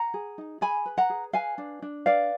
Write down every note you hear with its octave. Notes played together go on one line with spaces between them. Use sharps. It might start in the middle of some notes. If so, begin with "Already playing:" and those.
Already playing: F#5 A#5
G#4
D#4
G#4 G#5 B5
B4
F#5 A#5
G#4
B4 F5 G#5
D4
D4
B4 D5 F5